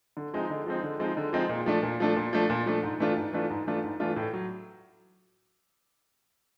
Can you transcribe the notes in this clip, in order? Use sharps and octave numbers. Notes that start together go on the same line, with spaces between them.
D3
F3 G#3 C4 D#4
D3
F3 G#3 C4 D#4
D3
F3 G#3 C4 D#4
D3
F3 G#3 C4 D#4
A#2
F3 A3 D4
A#2
F3 A3 D4
A#2
F3 A3 D4
A#2
F3 A3 D4
G#2
E3 A3 D4 F4
G#2
E3 A3 D4 F4
G#2
E3 A3 D4 F4
G#2
E3 A3 D4 F4
A2
F#3